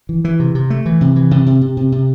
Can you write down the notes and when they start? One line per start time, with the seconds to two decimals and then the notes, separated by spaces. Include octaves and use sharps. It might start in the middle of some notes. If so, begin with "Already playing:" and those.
0.09 E3
0.24 E3
0.40 C3
0.55 C3
0.70 A3
0.86 E3
1.01 C3
1.16 E3
1.31 C3
1.46 C3
1.62 C3
1.77 C3
1.92 C3